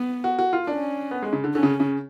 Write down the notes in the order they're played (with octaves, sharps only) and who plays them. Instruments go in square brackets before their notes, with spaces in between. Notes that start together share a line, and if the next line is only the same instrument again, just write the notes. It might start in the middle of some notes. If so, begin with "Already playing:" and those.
Already playing: [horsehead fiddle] B3
[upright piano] F#4
F#4
F4
[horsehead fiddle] C#4 [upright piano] D4
[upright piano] B3
G#3
C#3
D3
[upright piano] D3 [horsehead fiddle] C#4
[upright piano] C#3
C#3